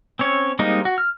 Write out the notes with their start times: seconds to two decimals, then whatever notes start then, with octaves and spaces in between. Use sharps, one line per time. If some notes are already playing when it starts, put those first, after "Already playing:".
0.19 C4 C#4 C#5
0.59 G3 G#3 A#3 C4 D#4
0.85 F#4
0.98 F6